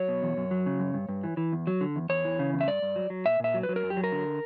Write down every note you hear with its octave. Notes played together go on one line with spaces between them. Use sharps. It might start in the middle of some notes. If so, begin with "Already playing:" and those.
Already playing: F#3 C#5
B2
E2
F#2
F#3
C#3
F#2
G2
G2
E3
E3
E2
F#3
D3
E2
E2 C#5
E3
C#3
E2
E5
G2 D5
G2
F#3
F#3
A#2 E5
A#2 E5
F#3
B4
F#3
A#4
F#2
G4
F#3
A#4
D3